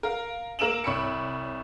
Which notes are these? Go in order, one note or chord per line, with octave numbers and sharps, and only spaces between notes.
A#4 F5
A#3 A#4 E6 D7 E7 F#7
C2 C#5 B5 E6 C#7